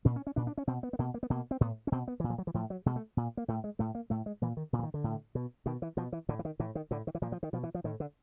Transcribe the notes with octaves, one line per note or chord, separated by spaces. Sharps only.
A#2 C#4
C#4
C#4
A#2 D4
D4
C#4
B2 C4
B3
B3
B2 A#3
A#3
B3
B2 A#3
C4
A2 B3
C#4
B2 C4
B3
A#2 E3
F3
F#3
E3
A2 F3
F#3
B2 G#3
A3
A#2
A#3
A2 A3
G#3
A2 A3
A#3
A2 A3
G#3
A#2 E3
D#3
A#2 D3
E3
D#3
D3
A2
B2
B2 D#3
E3
B2 F3
E3
A2 D3
E3
D#3
A2 E3
D#3
A2 D3
D#3
E3
A#2 F3
F3
D#3
B2 F3
E3
F3
A2 D#3
D3